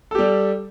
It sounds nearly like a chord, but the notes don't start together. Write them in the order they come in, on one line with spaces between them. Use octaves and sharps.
A4 G4 G3